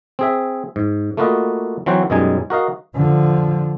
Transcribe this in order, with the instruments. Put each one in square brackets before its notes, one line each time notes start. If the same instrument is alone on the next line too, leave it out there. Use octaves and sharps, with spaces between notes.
[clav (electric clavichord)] C4 G#4 E5
G#2
A3 A#3 F4 F#4 B4 D#5
E3 F#3 C4 F#4 C5
F#2 B2 G3 G#3 D#4 G#5
F#4 A#4 D#5 F5
[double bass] D3 F3